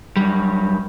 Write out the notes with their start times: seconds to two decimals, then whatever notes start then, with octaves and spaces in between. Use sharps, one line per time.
0.16 F#2 G3